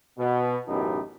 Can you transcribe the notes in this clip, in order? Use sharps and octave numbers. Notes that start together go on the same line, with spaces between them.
B2
A1 F#2 B2 D#4 E4 G4